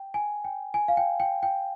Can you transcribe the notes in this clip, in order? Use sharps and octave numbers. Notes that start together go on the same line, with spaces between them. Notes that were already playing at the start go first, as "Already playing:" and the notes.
Already playing: G5
G#5
G5
G#5
F5
G5
G5
G5